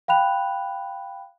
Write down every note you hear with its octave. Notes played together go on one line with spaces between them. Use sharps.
F5 G5 B5 F#6 F7